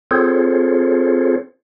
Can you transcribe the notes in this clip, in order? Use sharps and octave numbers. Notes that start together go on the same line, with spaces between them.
C4 F4 G#4 A4 C5 C#5